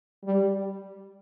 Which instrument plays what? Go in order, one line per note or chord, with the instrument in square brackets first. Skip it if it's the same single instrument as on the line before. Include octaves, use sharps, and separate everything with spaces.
[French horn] G3